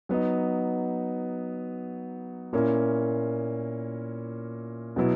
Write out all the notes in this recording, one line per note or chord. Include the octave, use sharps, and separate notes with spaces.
F#3 B3 D#4
A#2 A#3 C#4 E4
B2 F#3 B3 E4